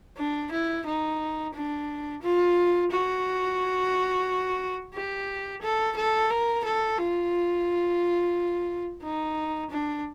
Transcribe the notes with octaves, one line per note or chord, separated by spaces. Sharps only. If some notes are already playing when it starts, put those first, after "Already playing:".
D4
E4
D#4
D4
F4
F#4
G4
A4
A4
A#4
A4
F4
D#4
D4